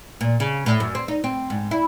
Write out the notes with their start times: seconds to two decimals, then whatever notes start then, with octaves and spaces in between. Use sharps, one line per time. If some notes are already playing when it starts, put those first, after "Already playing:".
0.21 A#2
0.40 C#3
0.66 A2
0.80 F#2
0.95 C4
1.08 D#4
1.24 C4
1.50 G#2
1.71 E4